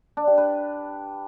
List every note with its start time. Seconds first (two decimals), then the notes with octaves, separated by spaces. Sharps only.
0.17 D4
0.27 G4
0.38 B4